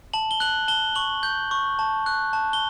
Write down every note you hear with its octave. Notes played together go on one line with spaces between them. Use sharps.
A5 F#7
G7
F#6 F#7
A5 G7
C#6 F#7
G6
C#6
A5
F#6
A5
G7